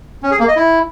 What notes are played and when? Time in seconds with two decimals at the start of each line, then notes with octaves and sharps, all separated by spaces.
0.23 C#4
0.31 G#4
0.39 A#3
0.48 D#5
0.56 E4